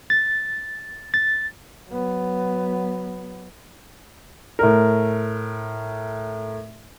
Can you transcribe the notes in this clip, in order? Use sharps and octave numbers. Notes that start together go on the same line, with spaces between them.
A6
A6
F#3 B3
A2 A#4